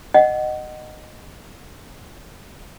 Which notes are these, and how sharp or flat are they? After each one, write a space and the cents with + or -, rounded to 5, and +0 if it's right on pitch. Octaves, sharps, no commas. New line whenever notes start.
D#5 -15 F#5 +20